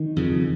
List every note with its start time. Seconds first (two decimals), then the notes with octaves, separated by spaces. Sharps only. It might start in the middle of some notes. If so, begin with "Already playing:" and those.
Already playing: D#3
0.16 F2 C#3